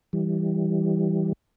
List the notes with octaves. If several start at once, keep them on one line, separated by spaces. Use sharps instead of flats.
E3 G3